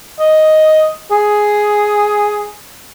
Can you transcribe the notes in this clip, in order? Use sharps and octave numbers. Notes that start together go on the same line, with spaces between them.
D#5
G#4